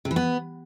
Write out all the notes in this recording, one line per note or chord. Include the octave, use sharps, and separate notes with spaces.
C3
E3
B3